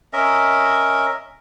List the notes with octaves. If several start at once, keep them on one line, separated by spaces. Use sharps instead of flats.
C#4 A#4 D#5 E5